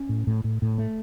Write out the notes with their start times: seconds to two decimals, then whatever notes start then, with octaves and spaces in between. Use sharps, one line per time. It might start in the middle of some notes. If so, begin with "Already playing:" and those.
Already playing: C#4
0.09 A2
0.27 A2
0.44 A2
0.62 A2
0.78 A3